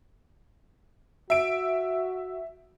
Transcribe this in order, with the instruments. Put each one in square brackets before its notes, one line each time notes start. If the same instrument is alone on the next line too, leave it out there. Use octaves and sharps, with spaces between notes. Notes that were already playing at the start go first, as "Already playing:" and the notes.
[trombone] F#4 [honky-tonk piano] E5 D7